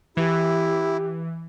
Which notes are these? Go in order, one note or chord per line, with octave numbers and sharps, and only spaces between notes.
E3 E4 G4